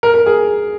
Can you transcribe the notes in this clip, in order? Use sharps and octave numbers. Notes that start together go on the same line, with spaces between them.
A#4
A#4
G#4